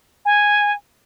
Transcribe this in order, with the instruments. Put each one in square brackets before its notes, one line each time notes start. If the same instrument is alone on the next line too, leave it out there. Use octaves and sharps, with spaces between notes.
[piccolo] G#5